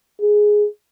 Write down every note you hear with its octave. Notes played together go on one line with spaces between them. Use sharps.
G#4